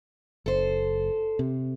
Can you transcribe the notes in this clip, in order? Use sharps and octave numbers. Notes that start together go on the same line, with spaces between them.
F#1 A4 C5
C3